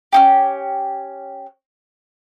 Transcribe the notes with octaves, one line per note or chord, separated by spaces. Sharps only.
C#4 D#4 G4